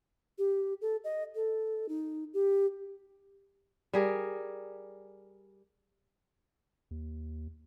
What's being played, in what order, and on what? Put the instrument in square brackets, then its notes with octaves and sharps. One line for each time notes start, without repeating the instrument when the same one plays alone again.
[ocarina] G4
A4
D#5
A4
D#4
G4
[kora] G3 G#4 A#4
[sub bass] D#2